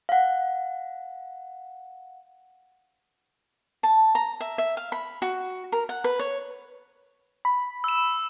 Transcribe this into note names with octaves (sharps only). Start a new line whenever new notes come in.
F5 F#5
A5
A#5
E5
E5
F5
B5
F#4
A#4
F#5
B4
C#5
B5
E6 E7